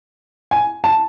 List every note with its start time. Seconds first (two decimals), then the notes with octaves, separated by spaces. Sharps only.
0.51 G#5
0.84 A5